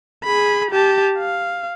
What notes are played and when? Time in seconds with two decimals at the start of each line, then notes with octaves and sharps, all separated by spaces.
0.24 G#4 B5
0.71 G4 A5
1.19 F5